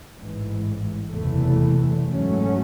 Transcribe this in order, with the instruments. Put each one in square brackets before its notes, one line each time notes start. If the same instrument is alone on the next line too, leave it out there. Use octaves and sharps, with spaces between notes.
[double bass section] A1 G#2 E3
F#1 E2 C3 E3 A3
G#2 F#3 A3 C#4